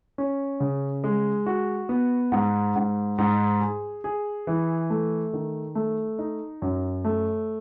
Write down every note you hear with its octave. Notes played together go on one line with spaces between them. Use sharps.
C#4
C#3
G#3
F#4
B3
G#2
G#2
G#2
G#4
G#4
E3
A3
D#3
A3
D#4
F#2
A3